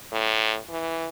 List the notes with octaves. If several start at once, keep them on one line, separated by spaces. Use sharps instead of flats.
A2
E3